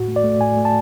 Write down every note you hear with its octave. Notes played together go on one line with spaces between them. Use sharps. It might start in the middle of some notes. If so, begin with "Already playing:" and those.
Already playing: A2 F#4
A3
D5
A3
A2 G#5
A3
A5